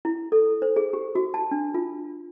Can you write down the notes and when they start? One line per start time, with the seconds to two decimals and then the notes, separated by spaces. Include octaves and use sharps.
0.05 E4
0.32 A4
0.62 C5
0.76 G#4
0.93 G4
1.15 F#4
1.34 A5
1.51 D4
1.74 F4